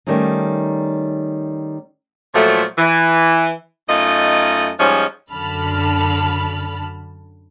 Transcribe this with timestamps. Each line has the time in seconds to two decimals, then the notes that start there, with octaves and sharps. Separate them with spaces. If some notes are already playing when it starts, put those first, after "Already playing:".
0.07 D#3 G3 A3 C#4 D#4
2.34 A#2 F3 F#3 A3
2.77 E3
3.88 F#2 A3 D#4 F4 D#5
4.78 G#2 F3 G3 G#3 C#4
5.30 F#2 D3 A5 B5 F6